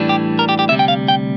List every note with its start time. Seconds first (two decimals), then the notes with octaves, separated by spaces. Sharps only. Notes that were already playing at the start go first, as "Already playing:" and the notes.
Already playing: A2 E3 G3 D4
0.09 G4
0.39 A#4
0.49 G4
0.59 G4
0.69 D2 C3 G3 E5
0.79 G5
0.88 F5
1.08 G5